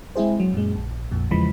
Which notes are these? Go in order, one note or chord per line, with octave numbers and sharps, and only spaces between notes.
G#3 C4 E4 G#4 C5
F#3
F#2 A#2 G#3
A#1
A#1 F2 A#2
E2 C#3 E3 F3 G#3 B5